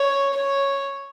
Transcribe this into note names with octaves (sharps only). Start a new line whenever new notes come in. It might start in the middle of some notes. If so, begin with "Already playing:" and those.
Already playing: C#5
C#5